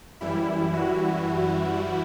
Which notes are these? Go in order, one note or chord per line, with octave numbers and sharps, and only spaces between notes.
F#2 E3 G3 E4
F#4